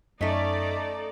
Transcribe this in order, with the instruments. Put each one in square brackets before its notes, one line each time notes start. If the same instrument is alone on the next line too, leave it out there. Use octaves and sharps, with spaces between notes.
[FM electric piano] F#2 D#5 B6 [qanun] A3 C#4 [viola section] D#4 A4 D5